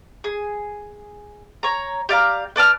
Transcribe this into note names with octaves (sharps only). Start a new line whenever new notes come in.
G#4
C#5 A#5
G4 D5 F5 A#5
B4 D5 A5 F6